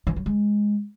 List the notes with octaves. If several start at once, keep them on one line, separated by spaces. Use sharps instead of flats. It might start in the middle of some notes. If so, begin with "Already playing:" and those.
E3
F#3
G#3